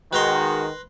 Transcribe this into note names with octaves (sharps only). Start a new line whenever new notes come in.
D#3 G#3 F#4 B4 A#5 C6